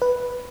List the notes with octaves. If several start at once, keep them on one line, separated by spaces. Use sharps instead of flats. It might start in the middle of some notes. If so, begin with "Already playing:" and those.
B4